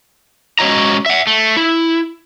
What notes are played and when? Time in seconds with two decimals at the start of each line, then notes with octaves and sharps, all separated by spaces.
0.59 G#3 C#4 F#4 C#5 D#5 A#5
1.06 E5 F#5
1.27 A3
1.57 E4